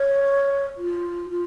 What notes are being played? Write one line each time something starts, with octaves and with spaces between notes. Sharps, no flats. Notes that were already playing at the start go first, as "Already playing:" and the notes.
Already playing: C#5
F4
F4